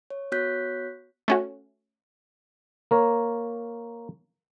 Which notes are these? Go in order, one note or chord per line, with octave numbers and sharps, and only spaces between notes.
C#5
B3 F#4 C#5 F#6 G6 B6
A3 C#4 F#4
A#3 A#4 C#5